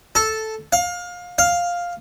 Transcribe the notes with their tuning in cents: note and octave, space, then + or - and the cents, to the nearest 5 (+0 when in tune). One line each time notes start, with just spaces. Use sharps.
A4 -5
F5 +25
F5 +5